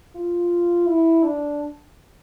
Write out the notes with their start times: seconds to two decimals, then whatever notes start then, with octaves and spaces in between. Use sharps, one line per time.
0.15 F4
0.87 E4
1.23 D4